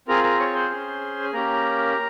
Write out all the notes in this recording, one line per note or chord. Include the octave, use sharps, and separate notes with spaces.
C4 F4 G#4 A#4 A#5
A#4 A#5
C#5 C#6
C5 C6
C#4 G#4
G#5
A#3 C#4 G4 A#4 A#5